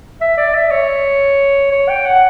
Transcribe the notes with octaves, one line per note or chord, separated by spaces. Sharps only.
E5
D5
E5
C#5
C#5
G5
F#5